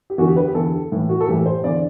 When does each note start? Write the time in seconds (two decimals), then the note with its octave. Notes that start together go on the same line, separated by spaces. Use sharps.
0.10 G4
0.18 E2 D3 F#4
0.27 G4
0.36 B4
0.47 G4
0.54 E2 D3 A4
0.92 A2 E3
1.09 F#4
1.20 A4
1.28 A2 E3 G4
1.46 C5
1.64 E2 D3 D5